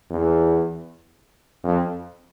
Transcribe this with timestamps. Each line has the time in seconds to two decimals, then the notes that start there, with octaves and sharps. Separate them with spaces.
0.10 E2
1.64 F2